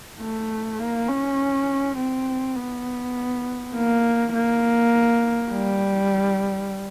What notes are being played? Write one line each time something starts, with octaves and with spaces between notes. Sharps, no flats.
A3
A#3
C#4
C4
B3
A#3
A#3
G3